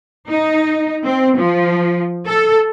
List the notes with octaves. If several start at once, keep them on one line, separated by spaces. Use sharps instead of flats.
D#4
C4
F3
A4